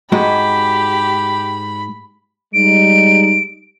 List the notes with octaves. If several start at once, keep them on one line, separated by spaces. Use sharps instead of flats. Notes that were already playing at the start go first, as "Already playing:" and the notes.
G#2 G#3 F#4 G4 B5
G3 G#3 D#4 D7